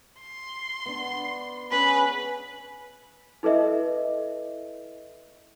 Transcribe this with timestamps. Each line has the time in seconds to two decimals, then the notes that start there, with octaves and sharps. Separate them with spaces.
0.21 C6
0.86 B3 D4
1.71 C#4 G#4 B4 B5
3.43 E4 A4 B4 D#5 E5